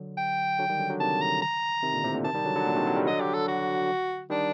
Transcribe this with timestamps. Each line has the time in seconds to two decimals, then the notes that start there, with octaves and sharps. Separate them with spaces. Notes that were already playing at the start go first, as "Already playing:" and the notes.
Already playing: D3 F#3
0.17 G5
0.59 D3 F#3
0.69 D#3 G3
0.79 D3 F#3
0.89 D3 F#3
1.00 C3 D#3 A5
1.22 A#5
1.42 A#5
1.83 C3 D#3
1.93 A#2 D3
2.04 A2 C3
2.14 A#2 D3
2.24 C3 D#3 A5
2.34 D#3 G3
2.44 D3 F#3
2.55 D3 F#3
2.65 A#2 D3
2.75 C3 D#3
2.86 D3 F#3
2.96 D#3 G3
3.06 D3 F#3 D#5
3.20 G4
3.34 A4
3.48 F#4
4.30 D#3 G3 D4